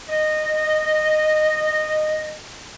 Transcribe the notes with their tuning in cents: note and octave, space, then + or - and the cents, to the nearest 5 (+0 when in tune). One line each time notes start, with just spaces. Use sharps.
D#5 -15